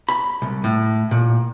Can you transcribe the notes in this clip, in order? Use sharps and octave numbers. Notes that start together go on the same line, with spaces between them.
B5
C2
A2
A#2